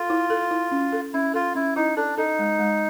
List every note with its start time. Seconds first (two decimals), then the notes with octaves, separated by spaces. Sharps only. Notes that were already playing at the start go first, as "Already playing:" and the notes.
Already playing: F4 A4
0.10 E4
0.30 A4
0.51 E4
0.71 C#4
0.93 A4
1.14 C#4 E4
1.34 F4 A4
1.55 C#4 E4
1.76 D#4 E4
1.96 D4 A4
2.17 D#4 A4
2.39 G#3
2.59 G#3